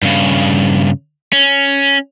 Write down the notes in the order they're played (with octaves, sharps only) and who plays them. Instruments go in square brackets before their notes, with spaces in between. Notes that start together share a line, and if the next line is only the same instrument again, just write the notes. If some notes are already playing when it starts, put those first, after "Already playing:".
[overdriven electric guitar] G2 C#3
C#4